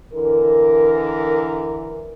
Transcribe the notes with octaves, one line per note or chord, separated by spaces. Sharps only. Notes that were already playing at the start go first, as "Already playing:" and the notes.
D3 E3 A#4